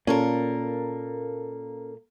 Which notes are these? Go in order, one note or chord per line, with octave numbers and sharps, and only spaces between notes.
A#2 A#3 C#4 A4 A#4